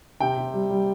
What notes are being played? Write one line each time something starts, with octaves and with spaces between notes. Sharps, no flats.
C3 G5
C3
G3
G3